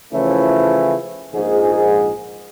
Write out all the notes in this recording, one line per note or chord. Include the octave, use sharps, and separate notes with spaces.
C#3 E3 F3 A3 C#4 E4
A#1 G#2 G#4